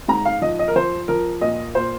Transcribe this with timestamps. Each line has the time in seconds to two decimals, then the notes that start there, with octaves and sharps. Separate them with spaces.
0.08 G#2 A#5
0.25 F5
0.42 F3 D#5
0.59 D#5
0.68 A#4
0.76 F3 C5
1.08 F3 A#4
1.41 A#2 D#5
1.75 A#2 C5